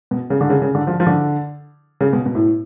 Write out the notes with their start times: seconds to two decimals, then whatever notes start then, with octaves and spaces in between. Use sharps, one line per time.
0.11 B2
0.30 C#3
0.41 D3
0.50 C#3
0.62 C#3
0.75 D3
0.87 F3
1.00 F3
1.07 D3
2.01 C#3
2.13 B2
2.26 B2
2.35 A2